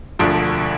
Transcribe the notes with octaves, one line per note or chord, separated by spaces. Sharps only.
E1 D2 D3 F3